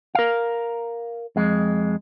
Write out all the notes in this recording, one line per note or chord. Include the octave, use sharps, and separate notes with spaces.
A#4 F5
F2 G#3